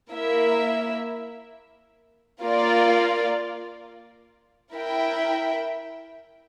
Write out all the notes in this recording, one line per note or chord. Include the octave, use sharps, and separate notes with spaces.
A#3 E4 A#4 E5
A#3 F4 A#4 D5 F5
E4 A#4 E5 G5